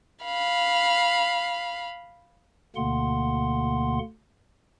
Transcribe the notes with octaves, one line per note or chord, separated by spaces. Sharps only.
F5 B5
D2 B2 D3 A#3 F#5 C6